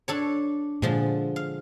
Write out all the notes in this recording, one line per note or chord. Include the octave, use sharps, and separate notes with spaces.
D4 A4 C#5
A#2 D3 F3 G#3
F5